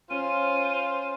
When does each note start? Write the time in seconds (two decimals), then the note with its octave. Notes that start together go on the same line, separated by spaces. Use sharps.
0.10 C#4 F4 C5 D#7